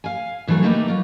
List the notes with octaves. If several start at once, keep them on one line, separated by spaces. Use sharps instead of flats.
F5 G#5
D2 E3 F#3 A3 G#4 A#4
A3 A#3 D#4 G4 A#4 B4
F#3 F4